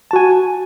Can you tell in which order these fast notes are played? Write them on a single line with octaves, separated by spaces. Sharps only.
A5 F#4 G#5